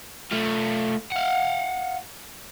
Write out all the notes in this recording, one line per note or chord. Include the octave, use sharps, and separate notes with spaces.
A3 F4
F5 F#5